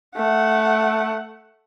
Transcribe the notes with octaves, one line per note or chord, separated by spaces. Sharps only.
A3 F#5